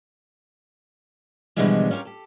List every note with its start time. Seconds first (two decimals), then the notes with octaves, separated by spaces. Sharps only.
1.56 B2 D3 E3 F3 G3 G#3
1.91 C#4 F4 G4 G#4 A#4
2.05 G4 A4